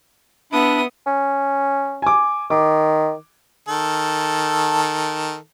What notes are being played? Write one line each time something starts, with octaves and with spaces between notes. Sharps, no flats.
B3 D4 E4 D#6
C#4
G#5 D6
D#3 D6
D#3 A4